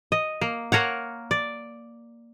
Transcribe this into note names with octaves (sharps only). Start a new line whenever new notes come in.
D#5
A#3
A#3 A#4 C#5 F#5
D5